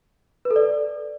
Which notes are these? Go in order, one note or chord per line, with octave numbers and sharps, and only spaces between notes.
B4
A4
D5